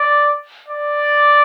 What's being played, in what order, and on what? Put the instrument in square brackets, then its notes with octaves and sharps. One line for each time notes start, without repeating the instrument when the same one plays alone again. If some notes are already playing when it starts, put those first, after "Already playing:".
Already playing: [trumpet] D5
D5